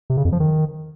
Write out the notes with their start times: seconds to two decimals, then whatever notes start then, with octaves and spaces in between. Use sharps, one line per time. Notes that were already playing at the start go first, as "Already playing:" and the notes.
0.10 C3
0.17 C#3
0.25 F2
0.32 F3
0.40 D#3